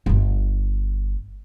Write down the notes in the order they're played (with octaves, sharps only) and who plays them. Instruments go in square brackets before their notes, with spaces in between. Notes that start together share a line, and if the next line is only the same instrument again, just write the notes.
[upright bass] D1 G1